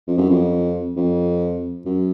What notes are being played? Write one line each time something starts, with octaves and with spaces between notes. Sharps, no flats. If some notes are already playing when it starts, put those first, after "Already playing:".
F2
F#2
F2
F2
F#2